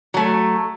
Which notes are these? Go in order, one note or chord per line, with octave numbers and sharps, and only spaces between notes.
F#3 A3